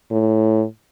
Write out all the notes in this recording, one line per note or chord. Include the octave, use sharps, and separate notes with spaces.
A2